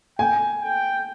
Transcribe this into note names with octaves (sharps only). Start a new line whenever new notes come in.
G5 G#5
G5